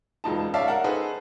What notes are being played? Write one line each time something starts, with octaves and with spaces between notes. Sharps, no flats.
E1 C#2 D#4 A5
C#5 D5 E5 F5 A5
A#4 F#5
D#4 G#4 A4 B4 C5